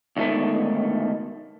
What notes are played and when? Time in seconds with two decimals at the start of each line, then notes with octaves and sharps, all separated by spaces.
0.17 D2 G#2 B2 D#3 A3